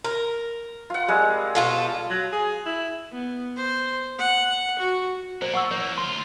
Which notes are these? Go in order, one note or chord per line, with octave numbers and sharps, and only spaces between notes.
A#4
F4 F#5
G3 G#3 C4
B2 F4 A4
F#3
G#4
E4
B3
C5
F#5
F#4
A#2 C5
F#5 C#6 E6
E3 A#3 C#5
D2 F4 C6